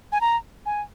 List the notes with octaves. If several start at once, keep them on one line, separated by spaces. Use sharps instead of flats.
G#5
A#5
G#5